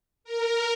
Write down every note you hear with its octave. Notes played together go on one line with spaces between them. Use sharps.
A#4